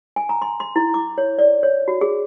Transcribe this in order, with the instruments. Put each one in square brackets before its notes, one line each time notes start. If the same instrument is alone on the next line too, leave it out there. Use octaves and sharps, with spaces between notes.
[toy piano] G#5
A#5
C6
C6
E4
D6
C#5
D5
C#5
F#4
G#4